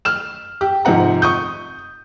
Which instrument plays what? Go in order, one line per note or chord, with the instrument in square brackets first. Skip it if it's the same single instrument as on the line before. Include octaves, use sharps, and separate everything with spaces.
[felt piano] F6 E7
G4
G#2 C3 F3 F#5 A#5
C#6 D#6 G6